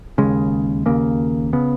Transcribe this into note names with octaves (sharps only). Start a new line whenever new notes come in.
D#2 C#3 G#3
D#2 C#3 A#3
C#3 B3